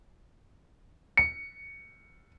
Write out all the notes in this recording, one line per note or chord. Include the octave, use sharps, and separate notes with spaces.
C#7